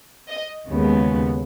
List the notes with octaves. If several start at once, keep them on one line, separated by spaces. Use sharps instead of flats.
D#5
D#2 C#3 G#3 B3